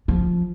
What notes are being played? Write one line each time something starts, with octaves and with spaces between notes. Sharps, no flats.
F3